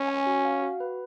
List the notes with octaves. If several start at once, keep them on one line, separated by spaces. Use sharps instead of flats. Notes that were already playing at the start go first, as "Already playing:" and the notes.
Already playing: C#4
G#5
F#4
F5
F#4
B4